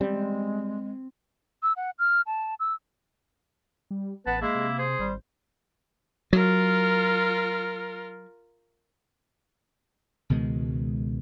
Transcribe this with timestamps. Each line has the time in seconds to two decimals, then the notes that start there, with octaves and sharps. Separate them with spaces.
0.01 G3 G#3 C4
1.63 E6
1.76 F#5
1.99 F6
2.27 A5
2.60 E6
3.91 G3
4.26 A1 B3 B4 A5
4.42 G#3 A#3 E4
4.55 C3
4.79 C3 G#4 C5
4.99 G#1 G3
6.33 F#3 F4 A#4
10.30 C#2 B2 D#3 G#3